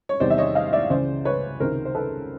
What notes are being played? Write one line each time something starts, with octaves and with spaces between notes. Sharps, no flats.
C#5
E2 C3 D#3 G3 C5 D5
E5
C#5 D#5
D#5 F5
D5 E5
C#2 C#3 E3 C5 D5
B4 C#5
C#2 C3 D#3 A#4 C5
C5
A4 B4